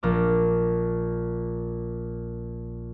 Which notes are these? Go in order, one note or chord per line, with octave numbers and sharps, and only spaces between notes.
A#1 A#4 D6